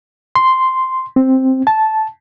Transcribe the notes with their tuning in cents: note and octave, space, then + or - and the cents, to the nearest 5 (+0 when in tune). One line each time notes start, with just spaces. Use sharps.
C6 -5
C4 +5
A5 -10